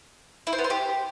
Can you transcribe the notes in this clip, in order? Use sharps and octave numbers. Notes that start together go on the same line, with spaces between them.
E4
C5
B3
C5
G4